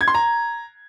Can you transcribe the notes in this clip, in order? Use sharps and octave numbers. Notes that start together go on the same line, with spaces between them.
G#6
C6
A#5